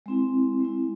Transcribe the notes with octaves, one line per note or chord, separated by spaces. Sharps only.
G#3 C4 E4
G#3 C4 E4